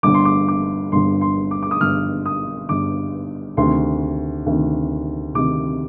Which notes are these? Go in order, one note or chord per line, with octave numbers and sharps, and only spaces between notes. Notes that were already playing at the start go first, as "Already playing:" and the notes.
G1 G2 D3 D6
C6
D6
D6
G1 G2 D3 C6
C6
D6
D6
D#6
G1 G2 D3 F6
D#6
G1 G2 D3 D6
D2 C3 D#3 C6
D2 C3 D#3
D2 C3 D#3 D6